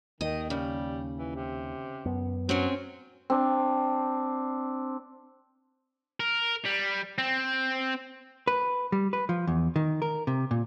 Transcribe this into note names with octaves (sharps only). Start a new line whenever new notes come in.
D#2 D#3 D#5
C#3 G3
E3
C3
F#2 B3
F#3 C4 C#4
C4 D4
A#4
G3
C4
B4
G3
B4
F3
E2
D#3
A#4
C3
A#2